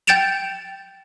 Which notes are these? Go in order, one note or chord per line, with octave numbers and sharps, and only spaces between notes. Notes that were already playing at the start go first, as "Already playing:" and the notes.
G5 G6 A6 D7 E7 F7